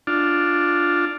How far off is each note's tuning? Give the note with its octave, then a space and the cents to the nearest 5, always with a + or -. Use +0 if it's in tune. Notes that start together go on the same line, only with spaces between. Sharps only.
D4 +0 F4 +0